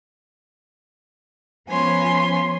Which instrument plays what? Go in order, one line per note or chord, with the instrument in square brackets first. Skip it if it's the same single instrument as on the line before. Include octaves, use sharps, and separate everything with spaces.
[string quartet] F3 B3 C#4 C#5 G#5 C6